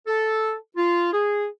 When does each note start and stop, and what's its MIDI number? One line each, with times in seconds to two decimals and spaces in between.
0.07 0.54 69
0.77 1.09 65
1.13 1.46 68